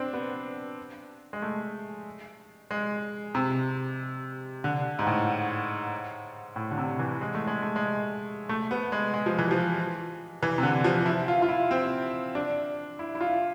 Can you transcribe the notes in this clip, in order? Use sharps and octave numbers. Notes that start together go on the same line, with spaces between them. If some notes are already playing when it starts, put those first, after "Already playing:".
Already playing: C4 D4
B3
G#3
A3
G#3
C3
D3
G#2
A2
A2
D3
C3
E3
G#3
A3
G#3
A3
G#3
A3
B3
G#3
G#3
F3
E3
F3
E3
C3
D3
F3
E4
F4
F4
E4
C4
D4
E4
E4
F4